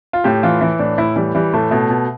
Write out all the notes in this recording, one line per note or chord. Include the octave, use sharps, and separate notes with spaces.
F4
A2 G4
E3 F4
E3 E4
A2 D4
A2 E4
E3 G3
E3 G3
A2 A3
B2 A3
B2